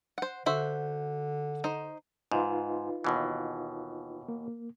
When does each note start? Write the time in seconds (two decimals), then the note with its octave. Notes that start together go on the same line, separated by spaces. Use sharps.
0.18 C5 F#5
0.46 D3 F#4 C5 E5
1.64 D#4 C5
2.32 G#2 D#4 F4 B4
3.04 D#2 B2 E3
4.28 A#3